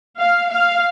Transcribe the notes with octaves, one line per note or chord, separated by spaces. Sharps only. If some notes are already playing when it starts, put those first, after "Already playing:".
F5
F5